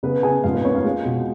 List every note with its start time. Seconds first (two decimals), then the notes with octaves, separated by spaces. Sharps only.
0.03 C#3 B3 B4
0.23 C#3 G#4 G#5
0.43 G#2 F4 F5
0.54 B3 B4
0.64 A#3 C#4 C#5
0.75 F4 F5
0.84 G#3
1.05 B2